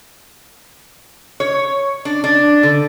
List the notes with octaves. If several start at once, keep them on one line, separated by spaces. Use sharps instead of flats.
C#5
D4
D4
D3